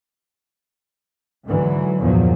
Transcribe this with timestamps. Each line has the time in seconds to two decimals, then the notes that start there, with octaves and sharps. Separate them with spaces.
1.45 G#2 D3 E3 F#3
2.01 G1 E2 A#2 D3 F3 F#3